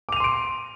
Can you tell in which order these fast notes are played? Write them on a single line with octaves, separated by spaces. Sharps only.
D6 F7 D#7 C6 D7